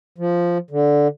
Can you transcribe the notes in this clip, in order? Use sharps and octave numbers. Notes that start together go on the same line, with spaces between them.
F3
D3